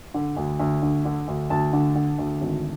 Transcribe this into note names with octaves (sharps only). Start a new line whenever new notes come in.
D3
D2
D2
D3
D3
D2
D2 A5
D3
D3
D2
G#1